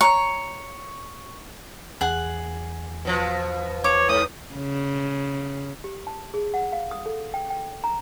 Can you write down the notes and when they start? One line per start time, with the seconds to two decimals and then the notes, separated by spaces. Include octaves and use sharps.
0.01 C#5 A#5
2.01 E2 G#4 F#5
3.05 B2 F3
3.84 C#5 D6
4.09 G#2 D#6
4.54 C#3
5.84 G4
6.07 A5
6.34 G#4
6.54 F#5
6.72 F5
6.91 D#6
7.06 A4
7.34 G5
7.50 G5
7.84 A#5